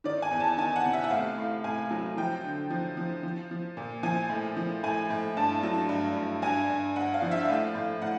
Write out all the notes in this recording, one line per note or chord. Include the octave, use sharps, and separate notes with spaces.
D#3 D5
G#5
E2
A5
D#3 G#5
F#5
C3
E5
F#5
A2 F5
A2
A2 G#5
F#3
F3 G5
D3
F3
F3
F3
F3
A#2
F3 G#5
A2
F3
A2 G#5
A2
G2 A5
F#3
G2
G2
G2 G#5
G2
G2 F#5
F5
F3
E5
A2 F5
A2
A2 F#5